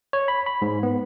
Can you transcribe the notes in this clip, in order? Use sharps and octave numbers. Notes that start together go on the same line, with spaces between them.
C#5
B5
B5
G#2
B3